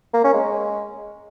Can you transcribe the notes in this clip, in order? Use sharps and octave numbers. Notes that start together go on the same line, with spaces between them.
A#3
C#4
G#3